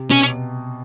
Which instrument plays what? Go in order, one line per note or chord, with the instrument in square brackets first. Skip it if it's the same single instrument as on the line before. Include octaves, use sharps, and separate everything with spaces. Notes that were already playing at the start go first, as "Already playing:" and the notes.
Already playing: [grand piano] C3
[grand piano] B2 [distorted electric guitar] C#4